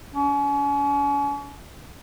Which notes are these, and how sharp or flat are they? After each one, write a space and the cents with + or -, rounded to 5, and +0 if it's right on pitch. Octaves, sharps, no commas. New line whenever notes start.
C#4 +35